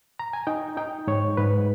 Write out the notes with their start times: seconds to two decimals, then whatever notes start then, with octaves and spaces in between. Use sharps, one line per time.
0.19 A#5
0.33 G#5
0.47 D#4 G5
0.77 D#4 G5
1.07 G#2 C#5
1.37 G#2 B4